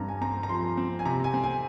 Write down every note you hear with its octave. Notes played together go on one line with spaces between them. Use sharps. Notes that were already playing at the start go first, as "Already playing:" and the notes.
Already playing: G2 C4 A#5
G#5
C4 A#5
A#5
F3 C6
C4
G#5
C3 A#5
G#5
C4
G#5